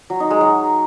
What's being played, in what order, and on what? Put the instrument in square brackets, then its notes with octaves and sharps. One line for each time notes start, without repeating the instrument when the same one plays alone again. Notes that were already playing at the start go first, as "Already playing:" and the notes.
[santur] F#3
D#4
G#3
F#3